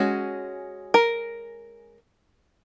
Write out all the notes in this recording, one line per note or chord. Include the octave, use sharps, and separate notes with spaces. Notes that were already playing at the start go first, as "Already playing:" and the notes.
Already playing: G#3 C#4 F#4
A#4